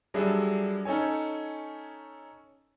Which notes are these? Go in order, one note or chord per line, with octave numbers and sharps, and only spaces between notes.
F#3 G3 D4 G#4 A4 E5
C#4 D#4 A4 C#5 G#5